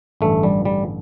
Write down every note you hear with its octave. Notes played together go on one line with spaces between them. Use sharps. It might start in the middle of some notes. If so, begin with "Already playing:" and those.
A1 G2 D3 A3
G3
G3